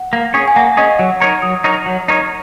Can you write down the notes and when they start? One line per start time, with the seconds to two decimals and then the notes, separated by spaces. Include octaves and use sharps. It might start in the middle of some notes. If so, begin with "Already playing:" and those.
Already playing: F#5
0.13 A#3
0.34 C#4 G#4 C#5
0.48 G#5
0.56 A#3 F#5
0.77 C#4 G#4 C#5 D#5
0.99 F#3 F#5
1.20 D#4 A#4 C#5 A#5
1.42 F#3 D#6
1.64 D#4 A#4 C#5
1.86 F#3
2.08 D#4 A#4 C#5